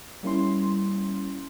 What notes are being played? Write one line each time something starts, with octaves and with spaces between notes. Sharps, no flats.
G3 A#3 C#4 E4 C6